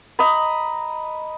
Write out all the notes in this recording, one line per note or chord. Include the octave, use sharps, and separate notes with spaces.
D#5 A#5 B5